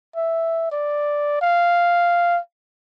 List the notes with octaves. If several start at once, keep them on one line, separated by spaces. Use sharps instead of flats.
E5
D5
F5